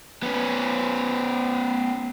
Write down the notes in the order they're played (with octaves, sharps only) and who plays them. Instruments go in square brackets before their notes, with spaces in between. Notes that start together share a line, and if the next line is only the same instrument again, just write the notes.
[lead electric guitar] B3 C#4